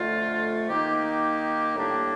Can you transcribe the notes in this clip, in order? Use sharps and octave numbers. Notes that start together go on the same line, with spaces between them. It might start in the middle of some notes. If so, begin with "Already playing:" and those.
Already playing: F2 D3 A3 F4
D#3 A#3 D#4 G4
G4
A2 G3 A#3 D4